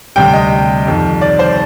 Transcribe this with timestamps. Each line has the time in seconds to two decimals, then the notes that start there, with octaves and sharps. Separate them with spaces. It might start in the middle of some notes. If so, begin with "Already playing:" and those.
0.16 D2 C3 G3 G5
0.34 D#5
0.86 F2 D#3 G3
1.21 D5
1.39 C5